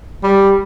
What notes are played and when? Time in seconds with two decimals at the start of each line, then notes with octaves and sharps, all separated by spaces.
0.24 G3